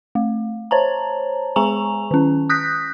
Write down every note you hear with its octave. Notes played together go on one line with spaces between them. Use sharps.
A3
C5 C#5 A5 A#5
G#3 G#4 G#5 A#5 C#6 F7
D#3 C#4
D#6 F#6 G6 A#6 B6